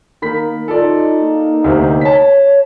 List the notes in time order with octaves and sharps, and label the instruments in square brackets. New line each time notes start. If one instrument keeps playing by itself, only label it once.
[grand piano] D#3 B5 B6 [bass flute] A#3
[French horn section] D#4 [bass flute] F4 [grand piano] A4 D5
[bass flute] A#3
[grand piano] D2 C3 C4
[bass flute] C#5 [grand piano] A5 B6